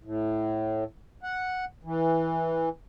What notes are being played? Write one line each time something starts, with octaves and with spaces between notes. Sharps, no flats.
A2
F#5
E3